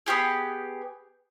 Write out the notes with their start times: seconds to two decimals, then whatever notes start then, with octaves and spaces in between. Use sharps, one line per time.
0.06 B3 C#4 G4 G#4